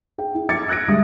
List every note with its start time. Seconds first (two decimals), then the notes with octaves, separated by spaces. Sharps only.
0.18 G#4 G5
0.35 E4
0.49 D6 G#6 A6 C#7
0.68 E6 F#6 G#6 A#6 D7
0.88 D2 G3 G#3 E5 D#6